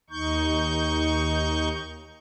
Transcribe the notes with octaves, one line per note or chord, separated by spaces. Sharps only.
D#2 D#4 C#6 G6